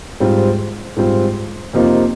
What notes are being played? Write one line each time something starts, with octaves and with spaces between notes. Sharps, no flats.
G#2 G3 C4 F4
G#2 G3 C4 F4
F2 C3 F3 A#3 D#4